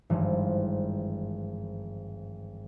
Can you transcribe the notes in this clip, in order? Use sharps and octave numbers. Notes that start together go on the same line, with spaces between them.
G#1 G2 E3 F3